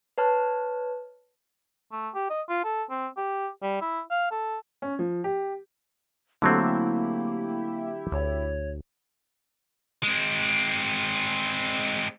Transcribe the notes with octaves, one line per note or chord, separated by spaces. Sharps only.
B4 C#5 A5 F6
A3
G4
D#5
F4
A4
C4
G4
G3
E4
F5
A4
C#4
F3
G4
D3 F#3 A3 A#3 C4 E4 G4
D2 C#5
G#3 C4